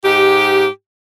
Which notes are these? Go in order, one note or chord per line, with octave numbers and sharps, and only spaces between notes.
G#2 D#4 G4